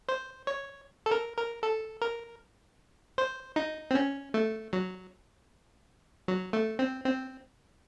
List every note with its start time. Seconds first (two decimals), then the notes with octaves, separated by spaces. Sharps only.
0.09 C5
0.47 C#5
1.06 A4
1.11 A#4
1.37 A#4
1.63 A4
2.02 A#4
3.18 C5
3.56 D#4
3.91 C4
3.95 C#4
4.34 A3
4.73 F#3
6.28 F#3
6.53 A3
6.79 C4
7.05 C4